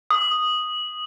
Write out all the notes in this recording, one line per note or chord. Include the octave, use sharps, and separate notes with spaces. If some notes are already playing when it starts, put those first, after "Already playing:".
D#6